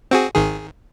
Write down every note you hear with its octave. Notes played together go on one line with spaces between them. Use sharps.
C4 F#4 G#4
G#1 D#3 G#4